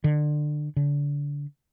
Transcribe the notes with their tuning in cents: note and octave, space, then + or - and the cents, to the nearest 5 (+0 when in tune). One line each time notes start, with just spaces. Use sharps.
D3 +25
D3 -30